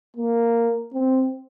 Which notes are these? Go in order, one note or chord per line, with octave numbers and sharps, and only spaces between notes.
A#3
C4